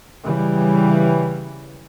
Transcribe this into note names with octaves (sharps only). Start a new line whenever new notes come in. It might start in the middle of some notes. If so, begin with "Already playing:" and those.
C#3 E3 G3